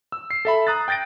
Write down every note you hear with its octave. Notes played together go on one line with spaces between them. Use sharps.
E6
C7
A4 E5 B5
A#5 D#6 F#6 A6
G5 G6 A6 A#6 D7